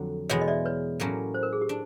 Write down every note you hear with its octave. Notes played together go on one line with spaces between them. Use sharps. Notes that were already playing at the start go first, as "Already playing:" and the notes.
Already playing: F2 D3 F#3
E2 B2 G#3 B3 C#5 D#5
D#5
D5 E5
B4 C#5
A2 F#3 A#3 C#4
C5
A#4
G#4
G4
D4